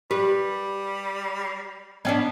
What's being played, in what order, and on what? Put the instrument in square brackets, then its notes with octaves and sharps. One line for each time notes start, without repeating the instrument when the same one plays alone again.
[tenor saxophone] G3 [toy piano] G4 [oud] B4
[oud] B3 C#4 D4 [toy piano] D#5 F#5